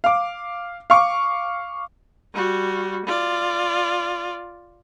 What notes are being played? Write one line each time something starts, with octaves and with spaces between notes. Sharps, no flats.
F5 D6
F5 C#6 D6
G3 F#4
F4 D5